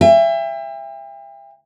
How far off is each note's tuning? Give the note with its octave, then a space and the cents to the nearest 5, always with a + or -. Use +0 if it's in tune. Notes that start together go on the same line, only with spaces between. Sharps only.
E5 +25 G5 +40